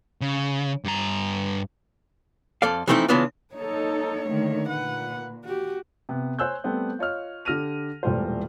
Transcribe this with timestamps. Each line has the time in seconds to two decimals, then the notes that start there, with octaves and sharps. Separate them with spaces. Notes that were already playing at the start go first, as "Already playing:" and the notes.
0.21 C#3
0.84 G2 A#5
2.62 F2 A4 D5 F5
2.87 E3 F3 A3 C4 D#4 E4
3.08 C#3 E3 B3 D4 F4
3.54 A#3 D#4 A4 C#5
4.28 D3 D#3 A3
4.69 A#2 B4 F#5
5.45 F#4 G4
6.09 C3 B3
6.39 C5 C#5 G#5 E6 F#6 G6
6.64 G3 A3 B3 C4
6.99 F4 C#5 D#5 F6
7.45 D3 G4 F6 A#6 D#7 F7
8.03 E1 A#2 E3 G3 A3 C5